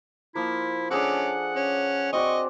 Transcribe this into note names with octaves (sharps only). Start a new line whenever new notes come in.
F3 A#3 E4
C#4 D4 G#4 A4 F#5 D6
C#4
C4 F#4 D5 D#5 C#6